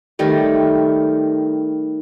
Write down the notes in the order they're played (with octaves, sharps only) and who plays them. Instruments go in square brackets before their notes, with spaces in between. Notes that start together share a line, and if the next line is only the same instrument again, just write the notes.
[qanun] D#3 G3 A3